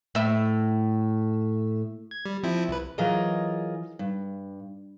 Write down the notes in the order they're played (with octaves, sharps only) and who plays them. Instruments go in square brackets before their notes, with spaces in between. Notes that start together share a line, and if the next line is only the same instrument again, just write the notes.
[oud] A2 E5
[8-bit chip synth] G#6
G3
F3 C4 E4
C2 B4
[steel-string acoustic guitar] E3 F#3 F4 G#4 A#4 D#5
G2